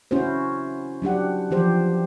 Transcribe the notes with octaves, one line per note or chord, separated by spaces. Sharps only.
C#4 E4 F#4 C5
F#3 D4 G4 F#5
E3 F3 G4 C5